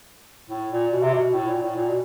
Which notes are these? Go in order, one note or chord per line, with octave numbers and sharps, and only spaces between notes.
A2
A#2
B2
C3
B2
B2
A2
A#2
A2
A#2
B2